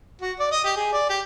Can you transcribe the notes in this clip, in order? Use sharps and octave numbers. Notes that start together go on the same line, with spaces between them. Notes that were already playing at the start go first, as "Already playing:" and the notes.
F#4
D5
D#5
G4
G#4
D5
G4